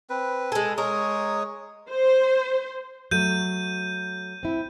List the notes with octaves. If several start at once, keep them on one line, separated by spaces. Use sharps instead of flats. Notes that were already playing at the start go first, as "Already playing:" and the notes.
C4 B4
G#3 A4 G#5
G#3 A#4 C#5 D#6
C5
F#3 A3 G6 D#7
C4 E4